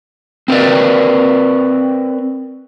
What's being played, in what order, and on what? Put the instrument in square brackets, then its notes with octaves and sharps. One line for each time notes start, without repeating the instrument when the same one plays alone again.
[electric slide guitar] C4 A#4 B4 D5